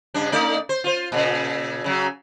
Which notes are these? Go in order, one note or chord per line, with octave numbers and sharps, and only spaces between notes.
G2 C#3 D4
A3 D#4 D5
C5
F4 C5
A#2 C#3
C#3 F#3